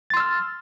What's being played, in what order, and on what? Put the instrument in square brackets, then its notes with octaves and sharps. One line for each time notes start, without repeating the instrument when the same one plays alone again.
[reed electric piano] A6
C6
E6
F6